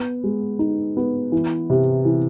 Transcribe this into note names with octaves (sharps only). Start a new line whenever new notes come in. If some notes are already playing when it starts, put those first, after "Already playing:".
Already playing: B3
G#3
D#4
B3
E3
C3
E3